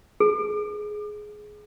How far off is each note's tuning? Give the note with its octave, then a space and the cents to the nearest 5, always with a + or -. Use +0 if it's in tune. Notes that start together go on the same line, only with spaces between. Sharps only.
G#4 +15